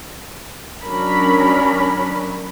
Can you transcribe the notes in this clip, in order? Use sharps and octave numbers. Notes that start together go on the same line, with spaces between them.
F#3 C#4 D4 A#4 B5